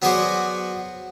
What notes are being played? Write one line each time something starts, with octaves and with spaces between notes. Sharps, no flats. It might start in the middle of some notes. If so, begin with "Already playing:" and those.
F#3 B3 F#4 G#4 C5 D5